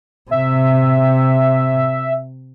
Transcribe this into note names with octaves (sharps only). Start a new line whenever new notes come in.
C3 E5